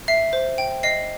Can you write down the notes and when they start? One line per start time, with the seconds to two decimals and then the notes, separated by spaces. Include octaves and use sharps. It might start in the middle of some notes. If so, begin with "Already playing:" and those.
0.08 E5 C7
0.33 C5
0.58 G5
0.83 D#5 C7